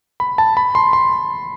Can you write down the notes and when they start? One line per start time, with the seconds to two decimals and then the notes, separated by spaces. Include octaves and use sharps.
0.20 B5
0.38 A5
0.57 B5
0.75 C6
0.93 C6